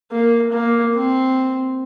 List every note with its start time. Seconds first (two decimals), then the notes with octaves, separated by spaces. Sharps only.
0.12 A#3
0.52 A#3
0.94 C4